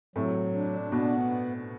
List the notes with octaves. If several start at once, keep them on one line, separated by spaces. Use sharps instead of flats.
A2 C3 F#3
D4
B2 B3